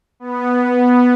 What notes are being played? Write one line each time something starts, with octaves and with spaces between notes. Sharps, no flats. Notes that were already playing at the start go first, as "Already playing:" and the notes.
B3